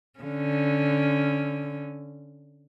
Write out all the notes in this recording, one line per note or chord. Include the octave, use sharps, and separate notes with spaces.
D3 C#4